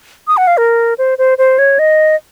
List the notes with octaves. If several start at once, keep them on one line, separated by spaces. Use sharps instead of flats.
D#6
F#5
F5
A#4
C5
C5
C5
C#5
D#5